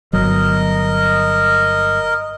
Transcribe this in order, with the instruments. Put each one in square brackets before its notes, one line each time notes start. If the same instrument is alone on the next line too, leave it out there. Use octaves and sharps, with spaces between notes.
[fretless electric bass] G1 F#3 [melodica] A#4 D#5